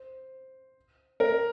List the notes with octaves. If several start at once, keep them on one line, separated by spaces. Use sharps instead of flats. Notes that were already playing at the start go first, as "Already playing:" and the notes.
Already playing: C5
A#4